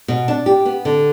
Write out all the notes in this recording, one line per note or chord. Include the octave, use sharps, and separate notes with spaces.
B2
D4
G4
B3
D3